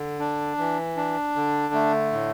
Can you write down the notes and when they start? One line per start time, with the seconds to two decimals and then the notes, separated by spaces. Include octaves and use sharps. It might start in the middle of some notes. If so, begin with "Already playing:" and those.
Already playing: D3
0.19 D4
0.58 E3
0.97 D4
1.36 D3
1.74 A3
2.13 A2